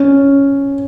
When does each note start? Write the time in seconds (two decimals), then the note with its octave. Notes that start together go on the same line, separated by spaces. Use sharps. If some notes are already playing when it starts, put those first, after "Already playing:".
Already playing: C#4